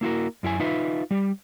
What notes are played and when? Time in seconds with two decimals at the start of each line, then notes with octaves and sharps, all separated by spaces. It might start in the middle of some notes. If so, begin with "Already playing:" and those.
0.01 A#3 E4 F#4 A#4
0.43 F#2 E4 F4 G#5
0.60 D#4 F4 B4 E5
1.11 G3 G4